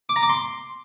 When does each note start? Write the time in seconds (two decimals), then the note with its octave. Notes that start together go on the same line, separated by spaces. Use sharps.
0.09 D6
0.16 A#5
0.23 D6
0.29 C6